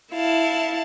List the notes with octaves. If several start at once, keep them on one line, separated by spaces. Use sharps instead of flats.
E4 F5 A5